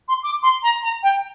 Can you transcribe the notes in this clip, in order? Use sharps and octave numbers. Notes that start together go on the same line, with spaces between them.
C6
D6
C6
A#5
A#5
G5